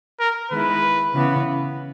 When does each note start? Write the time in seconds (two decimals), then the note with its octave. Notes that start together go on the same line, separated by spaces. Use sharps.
0.20 A#4
0.51 D#3 G#3 B3 E4 B4
1.15 C#3 E3 B3